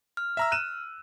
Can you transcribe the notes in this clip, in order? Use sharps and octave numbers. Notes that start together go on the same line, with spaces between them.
F6
E5 A#5 E6
F#6 D#7 E7